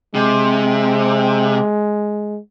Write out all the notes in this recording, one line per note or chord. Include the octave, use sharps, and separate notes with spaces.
C3 G#3